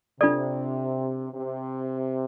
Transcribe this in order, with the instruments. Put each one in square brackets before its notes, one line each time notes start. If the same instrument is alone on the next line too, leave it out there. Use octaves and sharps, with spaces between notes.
[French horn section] C3 [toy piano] D4 F4 A4 D5
[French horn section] C3